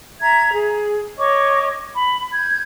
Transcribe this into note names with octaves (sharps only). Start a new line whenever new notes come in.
E5 A#5 G#6
G#4
C#5 D#5 C#6 D6
B5
G6 G#6